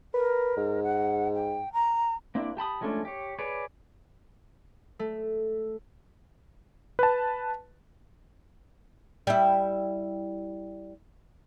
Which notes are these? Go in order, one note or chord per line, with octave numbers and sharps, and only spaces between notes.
A#4 B4
G#2
F#5
G5
A#5
A#3 C4 D4 E4
G4 A5 B5 D#6
F3 G#3 A3 C#4 D4
G4 C#5
G#4 B4 C#5 D5
A3
B4 A5
G3 E4